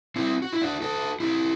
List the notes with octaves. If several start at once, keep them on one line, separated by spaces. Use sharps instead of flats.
C4 E4
F#4
E4
D4 F#4
F#4 A4
E4 G4